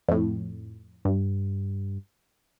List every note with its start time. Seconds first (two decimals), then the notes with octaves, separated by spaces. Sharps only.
0.08 F2 A2
1.05 G2